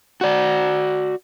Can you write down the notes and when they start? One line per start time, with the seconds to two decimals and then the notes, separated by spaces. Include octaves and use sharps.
0.21 F#4 D5